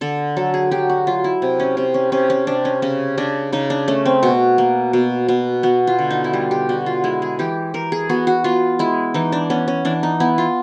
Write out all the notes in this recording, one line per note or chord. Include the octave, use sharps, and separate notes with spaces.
D3 A4
F#3 A4
G#4
F#3 G4
F#4
F#3 F4
E4
C3
C#4
C3
C#4
C3 C#4
C#4
C3 D4
C#4
C#3 C#4
C#3 D4
C#3 D#4
D4
A3 C#4
C4
B2 F#4
A#3
B2
B2
B3 F#4
F4
D3
D#4
E4
G3 F4
G4
D3 F#4
F4
G#3 E4
G#4
E3 G4
E3 A#4
G#4
B3 F#4
F#4
B3 F4
G#3 E4
E3 D#4
D4
B3 C#4
C#4
E3 D4
D#4
B3 E4
F4